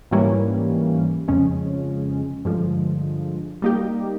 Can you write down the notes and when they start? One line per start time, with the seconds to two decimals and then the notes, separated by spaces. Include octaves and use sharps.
0.11 G#2 E3 G3 A#3 C#4
1.28 F2 C#3 F3 G#3 C#4
2.45 G2 D3 F3 G#3
3.62 G3 A#3 D#4 G4